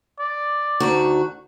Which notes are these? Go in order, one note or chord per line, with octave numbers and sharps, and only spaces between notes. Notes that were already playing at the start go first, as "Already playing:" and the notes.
D5
D2 D#3 F#4